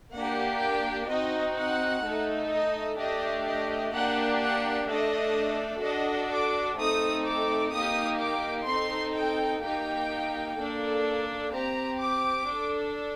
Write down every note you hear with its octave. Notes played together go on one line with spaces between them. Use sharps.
A#3 D4 G4 F#5
G5
C4 D#4 F#4 D#5
F#5
A3 D#4 A4
D#5
A3 D4 G4 D#5
D#5
A#3 D4 G4 F#5
F#5
A3 D4 A4 D#5
D4 F#4 A4 D#5
D6
A3 C4 D#4 A4 D#6
D6
A#3 D#4 G4 D#6
D6
C4 D#4 A4 C6
G5
A#3 D#4 G4 G5
A#3 D4 A4
C4 G4 A#5
D6
D4 A4